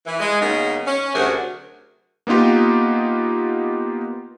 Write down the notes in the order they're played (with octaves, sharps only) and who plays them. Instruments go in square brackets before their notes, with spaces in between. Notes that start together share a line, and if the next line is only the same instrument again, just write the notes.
[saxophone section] E3
G#3
C#3 F#3 A#3 B3 D#4
C#4
D2 C3 F#3 G#4 A#4
[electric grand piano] A#3 B3 D#4 F4 G4